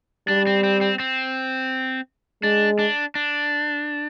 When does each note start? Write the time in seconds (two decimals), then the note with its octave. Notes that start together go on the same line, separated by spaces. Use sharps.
0.28 G3 D4
0.47 C4
0.64 C4
0.81 C4
0.99 C4
2.43 G#3 D4
2.79 D4
3.15 D4